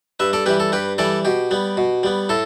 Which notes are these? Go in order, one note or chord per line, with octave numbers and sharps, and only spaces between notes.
G2 B4 E5
A4 D5
E3 G3 G4 B4
A4
G2 G4 B4
E3 G3 A4 D5
B2 G4
G3 B3
B2
G3 B3
A2 A4